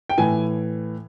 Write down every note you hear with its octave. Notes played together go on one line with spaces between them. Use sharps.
G5
A2 E3 G#5